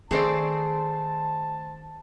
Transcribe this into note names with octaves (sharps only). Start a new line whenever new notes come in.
D#3 A3 C4 G#4 A4 C5 D5 A5